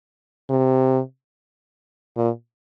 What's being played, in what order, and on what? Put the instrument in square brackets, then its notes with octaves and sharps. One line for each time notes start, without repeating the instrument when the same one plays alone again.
[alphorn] C3
A#2